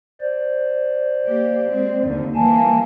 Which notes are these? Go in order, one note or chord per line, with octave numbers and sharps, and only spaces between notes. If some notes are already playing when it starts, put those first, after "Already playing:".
C5 D5
A#3 G4
G#3 C4
D#2 D3
E3 G3 A#3 G#5 A5